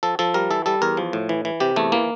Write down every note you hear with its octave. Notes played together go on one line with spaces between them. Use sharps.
F3 A4
F3 A4
G3 A#4
E3 A4
G3 A4
E2 A#4
F3
A2
E3
E3
C3 G4
E2 A3
E3 A#3